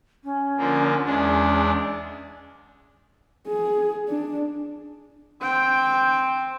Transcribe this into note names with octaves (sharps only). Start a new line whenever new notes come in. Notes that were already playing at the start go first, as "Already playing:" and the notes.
C#4
D3 F3 A#3
E2 G#3 C#4 D4
G#4
D4
C4 G5